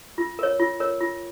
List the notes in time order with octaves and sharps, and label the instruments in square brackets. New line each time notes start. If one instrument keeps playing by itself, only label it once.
[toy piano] F4
A#4 C#5
F4
A#4 C#5
F4